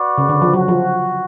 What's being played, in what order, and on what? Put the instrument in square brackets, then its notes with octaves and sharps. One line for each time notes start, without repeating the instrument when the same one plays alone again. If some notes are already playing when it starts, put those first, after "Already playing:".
Already playing: [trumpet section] F#4 B4 D5
[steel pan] C#3
D3
F3
[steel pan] F#3 [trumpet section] F#4
[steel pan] F3